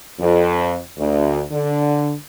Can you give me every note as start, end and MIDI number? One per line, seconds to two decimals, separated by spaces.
0.20 0.77 41
0.98 1.41 38
1.52 2.14 50